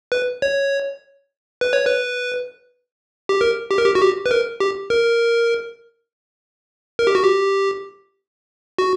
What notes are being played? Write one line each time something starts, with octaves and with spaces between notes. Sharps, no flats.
B4
C#5
B4
C#5
B4
G4
A#4
G4
A#4
G4
F#4
G4
B4
A#4
G4
A#4
A#4
G4
F#4
G4
F#4